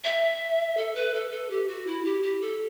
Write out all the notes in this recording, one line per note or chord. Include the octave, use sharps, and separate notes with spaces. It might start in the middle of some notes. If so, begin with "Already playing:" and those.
E5
A4
B4
A4
A4
G4
F#4
E4
G4
G4
A4